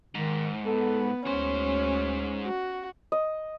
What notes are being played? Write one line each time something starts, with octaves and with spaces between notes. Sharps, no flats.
G#2 D#3
B3 A4
D2 G#3 C#4 C5
F#4
D#5